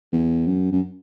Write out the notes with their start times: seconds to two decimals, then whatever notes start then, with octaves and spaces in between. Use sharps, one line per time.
0.12 E2
0.47 F#2
0.72 F#2